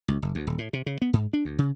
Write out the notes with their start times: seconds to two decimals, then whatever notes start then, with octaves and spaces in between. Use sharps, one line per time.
0.08 C#2
0.22 F#1
0.35 D2
0.47 D#1
0.58 A2
0.73 C3
0.86 C#3
1.02 B3
1.13 G#2
1.33 D4
1.45 D2
1.59 C#3